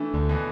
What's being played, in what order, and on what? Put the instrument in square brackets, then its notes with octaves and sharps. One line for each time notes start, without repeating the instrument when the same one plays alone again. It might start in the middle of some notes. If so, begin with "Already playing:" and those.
Already playing: [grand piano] E3 A3 [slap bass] D4
[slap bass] D2 [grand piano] D3
[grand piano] B2 E3